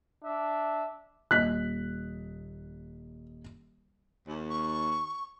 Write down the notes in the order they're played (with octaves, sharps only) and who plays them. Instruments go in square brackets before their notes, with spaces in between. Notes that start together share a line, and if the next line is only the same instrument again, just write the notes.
[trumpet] D4 [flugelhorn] E5
[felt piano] D#1 D#5 B6 [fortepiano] F#6
[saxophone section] D#2
[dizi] C#6